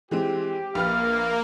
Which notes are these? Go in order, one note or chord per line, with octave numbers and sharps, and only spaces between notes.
E3 G#3 C4 G4
A#1 A#3 B4 F5 F6